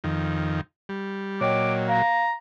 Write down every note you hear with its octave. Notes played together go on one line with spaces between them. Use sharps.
F2 D#3
G3
A#2 F#3 C#5 D#5 G5 D6
F5 A#5